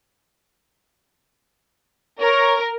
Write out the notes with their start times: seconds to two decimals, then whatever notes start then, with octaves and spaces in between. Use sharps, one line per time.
2.20 A#4 C#5